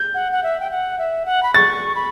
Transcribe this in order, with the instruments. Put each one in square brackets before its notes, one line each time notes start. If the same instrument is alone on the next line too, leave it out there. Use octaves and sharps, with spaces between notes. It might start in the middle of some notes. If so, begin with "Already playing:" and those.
Already playing: [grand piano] G6
[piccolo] F#5
F#5
E5
G5
F#5
E5
F#5
B5
[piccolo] C#6 [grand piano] A6
[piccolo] B5